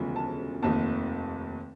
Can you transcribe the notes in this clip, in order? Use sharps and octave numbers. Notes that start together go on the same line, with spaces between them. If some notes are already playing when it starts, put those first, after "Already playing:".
Already playing: E1 D2 C#3 F3
A5
F1 D#2 D#3 A5